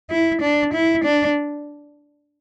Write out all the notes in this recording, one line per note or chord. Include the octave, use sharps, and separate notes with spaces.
E4
D4
E4
D4